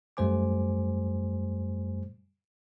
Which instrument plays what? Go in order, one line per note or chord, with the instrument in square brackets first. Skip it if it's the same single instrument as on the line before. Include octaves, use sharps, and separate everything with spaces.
[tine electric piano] F#2 G3 A3 C5 G#5 D6